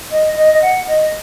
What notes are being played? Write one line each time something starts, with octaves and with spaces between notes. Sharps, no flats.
D#5
D#5
D#5
F#5
D#5